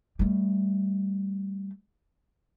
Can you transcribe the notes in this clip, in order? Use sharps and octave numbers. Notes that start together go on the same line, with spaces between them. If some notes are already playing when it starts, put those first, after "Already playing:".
G3 A3